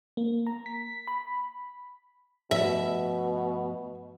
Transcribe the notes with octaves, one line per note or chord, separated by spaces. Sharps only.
A#3
A#5
B6
B5
G2 B2 F3 A3 E5